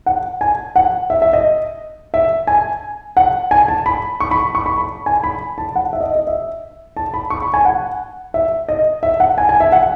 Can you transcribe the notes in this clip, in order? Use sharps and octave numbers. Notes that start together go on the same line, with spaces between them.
F#5
G#5
F#5
E5
E5
D#5
E5
G#5
F#5
G#5
A5
B5
C#6
B5
C#6
B5
B5
G#5
B5
A5
F#5
E5
D#5
D#5
E5
A5
B5
C#6
B5
G#5
F#5
E5
D#5
E5
F#5
G#5
G#5
E5
F#5